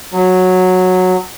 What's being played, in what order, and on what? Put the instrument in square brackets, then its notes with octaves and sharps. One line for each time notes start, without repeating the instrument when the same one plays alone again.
[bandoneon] F#3